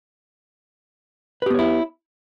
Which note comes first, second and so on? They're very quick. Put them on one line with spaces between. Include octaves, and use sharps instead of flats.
B4 G4 B3 C#5 E4